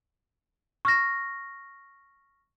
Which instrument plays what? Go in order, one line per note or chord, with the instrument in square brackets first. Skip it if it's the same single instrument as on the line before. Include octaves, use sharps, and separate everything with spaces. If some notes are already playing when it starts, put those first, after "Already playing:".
[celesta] C#6 F6 A#6